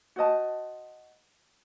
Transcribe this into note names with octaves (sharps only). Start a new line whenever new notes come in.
F#4 C5 D#5 A5